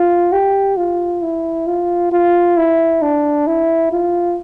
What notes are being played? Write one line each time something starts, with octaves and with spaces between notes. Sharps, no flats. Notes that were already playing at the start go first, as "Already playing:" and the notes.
Already playing: F4
G4
F4
E4
F4
F4
E4
D4
E4
F4